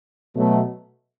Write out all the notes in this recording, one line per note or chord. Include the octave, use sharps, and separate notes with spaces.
B2 F#3 A3